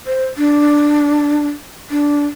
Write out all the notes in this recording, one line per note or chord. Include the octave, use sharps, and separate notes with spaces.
C5
D4
D4